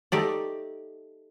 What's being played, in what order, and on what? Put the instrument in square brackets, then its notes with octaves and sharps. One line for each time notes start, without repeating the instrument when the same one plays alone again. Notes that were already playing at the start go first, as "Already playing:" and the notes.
[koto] A3 D#4 G4 D5